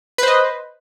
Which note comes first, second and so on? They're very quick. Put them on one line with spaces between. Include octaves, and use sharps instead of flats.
B4 C5 D#5